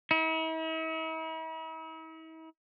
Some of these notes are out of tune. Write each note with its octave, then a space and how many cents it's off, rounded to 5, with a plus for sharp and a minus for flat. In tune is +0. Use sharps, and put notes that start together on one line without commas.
E4 -45